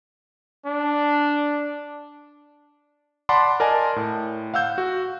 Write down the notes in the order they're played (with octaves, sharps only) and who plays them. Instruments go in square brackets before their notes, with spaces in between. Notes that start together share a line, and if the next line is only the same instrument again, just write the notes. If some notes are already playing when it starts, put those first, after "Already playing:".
[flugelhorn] D4
[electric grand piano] D5 F#5 A5 B5 C6 D6
A#4 D5 D#5 G#5 A5
A2
F5 F#5 E6 G6
F#4